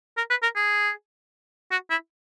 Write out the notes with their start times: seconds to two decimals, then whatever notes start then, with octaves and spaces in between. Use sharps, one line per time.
0.17 A#4
0.30 B4
0.43 A#4
0.56 G#4
1.71 F#4
1.90 E4